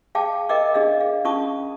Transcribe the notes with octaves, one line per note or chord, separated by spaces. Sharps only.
G#4 F5 G5 A5 D6
A#4 D#5 E5 G5 D6
D4 G#4 D#5 F5
F5
C#4 F4 A5 C#6 D#6